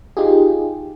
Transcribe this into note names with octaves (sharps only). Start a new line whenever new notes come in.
D#4 F4 G4 G#4